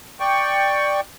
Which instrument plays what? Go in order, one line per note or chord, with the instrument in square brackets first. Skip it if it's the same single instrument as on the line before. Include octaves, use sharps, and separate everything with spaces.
[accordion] D5 G5 C#6